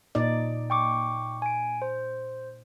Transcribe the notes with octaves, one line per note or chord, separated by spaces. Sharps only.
A#2 D#4 D5
G5 C#6 D6
G#5 D7
C5